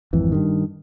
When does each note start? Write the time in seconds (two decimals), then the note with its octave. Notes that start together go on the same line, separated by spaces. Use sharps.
0.13 G#1 F2 E3
0.32 G2 D#3